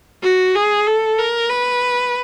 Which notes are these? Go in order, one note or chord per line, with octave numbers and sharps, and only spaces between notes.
F#4
G#4
A4
A#4
B4